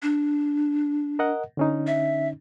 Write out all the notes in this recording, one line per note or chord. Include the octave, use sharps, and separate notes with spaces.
D4
A#4 D#5 F#5
D3 C#4 D#4
E5